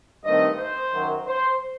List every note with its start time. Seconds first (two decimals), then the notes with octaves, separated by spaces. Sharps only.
0.24 G2 D#3 A3 C4 D#5
0.57 C5
0.92 F#2 D#3 F#3
1.26 C5